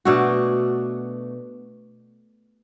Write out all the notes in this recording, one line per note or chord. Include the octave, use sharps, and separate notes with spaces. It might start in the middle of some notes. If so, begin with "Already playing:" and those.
B2 A3 D4 F#4